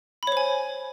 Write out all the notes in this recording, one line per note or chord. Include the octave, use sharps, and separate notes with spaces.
C5 C#5 G#5 B5